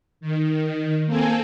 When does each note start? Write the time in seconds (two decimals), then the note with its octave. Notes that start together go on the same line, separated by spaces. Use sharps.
0.21 D#3
1.06 A#3 C4 A4 G#5